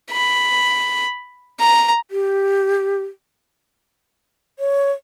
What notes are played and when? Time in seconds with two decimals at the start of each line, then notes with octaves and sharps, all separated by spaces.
0.11 B5
1.60 A#5
2.11 G4
4.59 C#5